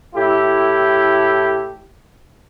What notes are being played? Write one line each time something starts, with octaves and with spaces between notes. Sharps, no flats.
A2 E4 G4 A4